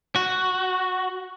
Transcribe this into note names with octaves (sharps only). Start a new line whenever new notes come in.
F#4